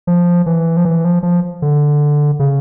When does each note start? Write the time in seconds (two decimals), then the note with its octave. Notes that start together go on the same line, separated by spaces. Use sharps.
0.07 F3
0.46 E3
0.77 F3
0.85 E3
1.04 F3
1.23 F3
1.62 D3
2.39 C#3